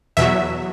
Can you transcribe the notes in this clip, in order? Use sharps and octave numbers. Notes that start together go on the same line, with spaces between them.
E2 B2 F#3 E5